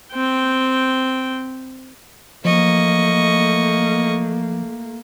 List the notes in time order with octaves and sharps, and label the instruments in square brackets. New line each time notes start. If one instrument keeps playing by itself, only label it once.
[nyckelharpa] C4 G5
[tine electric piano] F3 [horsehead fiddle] A3 A#3 [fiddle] D#5 C#6